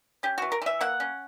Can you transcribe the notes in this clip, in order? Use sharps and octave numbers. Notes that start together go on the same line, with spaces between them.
C#4 G4
E3 F#4
A#4
E3 E5
A#3 F#5
C#4